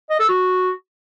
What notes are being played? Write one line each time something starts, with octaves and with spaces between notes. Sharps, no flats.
D#5
A4
F#4